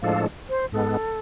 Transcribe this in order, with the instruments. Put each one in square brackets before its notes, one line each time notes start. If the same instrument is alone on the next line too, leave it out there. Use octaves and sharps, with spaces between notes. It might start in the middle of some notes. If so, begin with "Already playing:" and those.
[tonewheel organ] A2 F3 G#3 D4 A4 [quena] F5
[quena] C5
[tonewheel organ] G#2 G#3 B3 [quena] A4